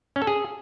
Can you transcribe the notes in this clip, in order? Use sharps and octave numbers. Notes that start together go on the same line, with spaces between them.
C#4
A4
G#4